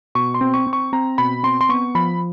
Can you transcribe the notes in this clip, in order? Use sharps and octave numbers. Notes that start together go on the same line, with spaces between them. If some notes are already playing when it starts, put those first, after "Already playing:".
B2 C#6
C6
C4
C#6
C4
C#6
C4 A#5
B2 B5
C4 C6
C6
B3 C#6
F3 B5